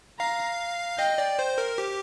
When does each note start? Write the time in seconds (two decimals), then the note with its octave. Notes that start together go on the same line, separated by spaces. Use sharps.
0.19 F5 A#5
0.99 D#5 G5
1.18 D5
1.39 C5
1.58 A#4
1.78 G4